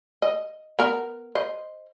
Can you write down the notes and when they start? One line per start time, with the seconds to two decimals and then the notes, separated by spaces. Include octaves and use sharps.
0.22 D#5
0.79 B3 A#4
1.35 C5 D#5